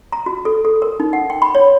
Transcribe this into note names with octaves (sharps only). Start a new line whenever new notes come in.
A#5
F#4
A4
A4
A#4
D#4
F#5
G5
B5
C#5